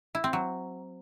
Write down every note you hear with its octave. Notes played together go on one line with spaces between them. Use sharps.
E4
C4
F#3